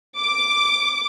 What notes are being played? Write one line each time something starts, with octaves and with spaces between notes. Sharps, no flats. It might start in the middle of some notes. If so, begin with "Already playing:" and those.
D6